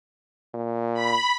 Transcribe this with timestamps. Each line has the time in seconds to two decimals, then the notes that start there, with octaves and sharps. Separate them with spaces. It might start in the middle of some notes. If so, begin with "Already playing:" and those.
0.54 A#2
0.94 B5